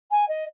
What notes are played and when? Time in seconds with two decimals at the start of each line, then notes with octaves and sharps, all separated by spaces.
0.11 G#5
0.28 D#5